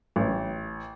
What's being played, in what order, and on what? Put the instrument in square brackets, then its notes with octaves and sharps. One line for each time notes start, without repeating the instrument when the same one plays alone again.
[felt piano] A1